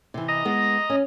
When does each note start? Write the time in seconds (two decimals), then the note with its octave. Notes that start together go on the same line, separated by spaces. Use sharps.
0.14 C3 E3
0.28 D#5 A#5
0.45 G#3 B3
0.90 C#4